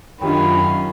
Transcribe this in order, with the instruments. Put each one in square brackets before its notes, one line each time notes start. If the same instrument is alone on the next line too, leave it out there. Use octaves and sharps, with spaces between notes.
[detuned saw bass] F#2 [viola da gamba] D#3 C#4 F4 [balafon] D4 G4 G5 [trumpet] B5